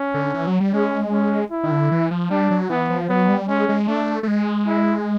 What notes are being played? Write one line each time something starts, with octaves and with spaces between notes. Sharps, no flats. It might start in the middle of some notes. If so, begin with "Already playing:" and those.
Already playing: C#4
D3
E3
F#3
G3
G#3 C#4
C#4
E4
D#3
D3
E3
F3
G3 D4
F#3
E3 B3
F3
F#3 B3
G3
G#3 C#4
G#3
A3 D4
A3
G#3
E4